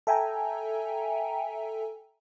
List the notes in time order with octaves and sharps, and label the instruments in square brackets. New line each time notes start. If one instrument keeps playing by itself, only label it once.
[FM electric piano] A4 E5 G5 G#5 A#5